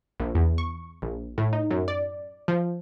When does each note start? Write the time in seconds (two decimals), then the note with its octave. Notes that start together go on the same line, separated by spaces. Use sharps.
0.20 A#1
0.35 E2
0.58 C#6
1.02 A#1
1.38 A2
1.53 D#4
1.71 F#2
1.88 D5
2.48 F3